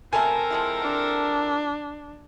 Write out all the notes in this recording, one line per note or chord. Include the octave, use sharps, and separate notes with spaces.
B2 A3 C4 A4 A#4 E5 G#5
F3 G#3 E4
D4